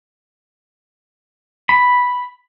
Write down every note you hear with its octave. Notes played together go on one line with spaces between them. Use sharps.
B5